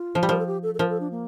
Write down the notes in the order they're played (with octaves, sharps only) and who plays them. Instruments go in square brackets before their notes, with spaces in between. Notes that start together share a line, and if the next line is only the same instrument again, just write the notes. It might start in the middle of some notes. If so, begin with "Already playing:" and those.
Already playing: [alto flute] F4
[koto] F3
G3
[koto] F3 [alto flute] A#4
[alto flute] A4
G4
A4
A4
[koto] F3 [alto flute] A#4
[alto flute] A4
D4
A#3